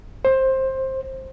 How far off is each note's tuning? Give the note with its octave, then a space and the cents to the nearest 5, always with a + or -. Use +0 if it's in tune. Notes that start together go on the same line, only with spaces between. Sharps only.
C5 +15